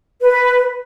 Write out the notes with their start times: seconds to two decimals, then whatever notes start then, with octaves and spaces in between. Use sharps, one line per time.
0.21 B4